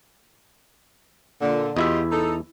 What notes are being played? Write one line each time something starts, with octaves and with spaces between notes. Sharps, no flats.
A#2 D3
E2 E4 F4 G4 D#5 E5
D#4 A4